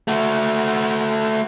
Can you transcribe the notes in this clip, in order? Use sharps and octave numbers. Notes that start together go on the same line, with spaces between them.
A3 F#4